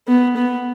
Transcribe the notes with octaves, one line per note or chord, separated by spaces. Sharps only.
B3
B3